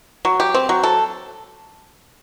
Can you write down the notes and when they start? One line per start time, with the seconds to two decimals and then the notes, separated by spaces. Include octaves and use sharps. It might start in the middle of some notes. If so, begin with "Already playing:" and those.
0.25 F#3
0.40 G4
0.54 C4
0.69 F#3
0.83 A4